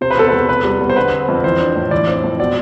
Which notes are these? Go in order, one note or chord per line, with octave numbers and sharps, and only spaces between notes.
C3 C5
B4
E2 A4
B4
E2
C3 B4
G3
E2
C5
D3 B4
C4
F2
E3 C5
D4
A2
E3 D5
C4
F2
B2 D5